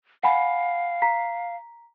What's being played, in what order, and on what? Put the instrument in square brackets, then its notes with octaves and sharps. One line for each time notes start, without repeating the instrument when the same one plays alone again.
[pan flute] F5 [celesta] F#5 G#5 B5
[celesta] A#5 B6